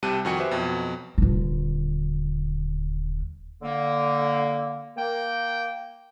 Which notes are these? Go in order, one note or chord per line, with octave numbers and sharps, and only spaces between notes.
C2 C3 G3 A5 F#6 D#7
F2 D#3 F#4 G5 G#5 C#7
G4 B4 C5 E5
F2 B2 F#3
D#1 D3
D3 A#3
A#3 G5